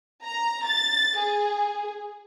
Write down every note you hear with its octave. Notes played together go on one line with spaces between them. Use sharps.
A#5
A6
G#4